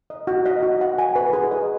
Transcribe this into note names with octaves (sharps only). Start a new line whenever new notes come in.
D#5
F#4
D#5
F#4
F#5
G#5
B4
G#4
D#5